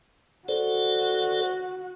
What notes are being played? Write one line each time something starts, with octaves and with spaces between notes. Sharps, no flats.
F#4 A4 C5 D5